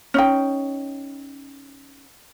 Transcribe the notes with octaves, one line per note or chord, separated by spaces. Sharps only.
C#4 D#4 G5